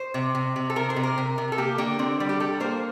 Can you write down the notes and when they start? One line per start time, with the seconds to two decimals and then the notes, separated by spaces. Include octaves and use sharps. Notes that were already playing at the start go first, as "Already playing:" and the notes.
Already playing: C5
0.14 C3
0.35 C3
0.56 C3
0.70 A4
0.76 C3 A#4
0.90 C5
0.96 C3
1.04 A#4
1.18 C3
1.38 C3
1.52 A4
1.58 A#3 G4
1.78 D3 A#3
1.99 D3 C4
2.20 G3
2.29 G4
2.40 G3 A4
2.60 A#3 C5